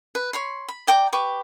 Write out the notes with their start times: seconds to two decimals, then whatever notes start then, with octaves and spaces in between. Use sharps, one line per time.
0.15 B4
0.33 C#5 B5 C6
0.68 B5
0.87 D5 G5 A#5 D6
1.12 G4 B4 C#6 D6